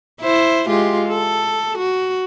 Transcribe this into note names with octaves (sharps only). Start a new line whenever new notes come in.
E4 C5
G#3 F4 G4
A4
F#4